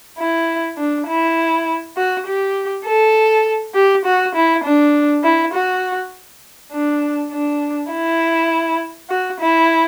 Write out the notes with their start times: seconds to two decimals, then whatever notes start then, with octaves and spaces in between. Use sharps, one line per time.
0.18 E4
0.77 D4
1.08 E4
1.97 F#4
2.27 G4
2.86 A4
3.75 G4
4.05 F#4
4.35 E4
4.64 D4
5.24 E4
5.54 F#4
6.72 D4
7.32 D4
7.92 E4
9.10 F#4
9.40 E4